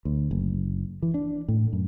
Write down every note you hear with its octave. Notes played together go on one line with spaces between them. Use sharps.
D2
F#1
E3
D4
A2
F#2